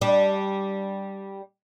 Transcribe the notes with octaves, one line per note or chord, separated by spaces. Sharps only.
G3 D4